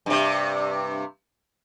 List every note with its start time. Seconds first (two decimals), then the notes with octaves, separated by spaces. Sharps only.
0.06 G2 C3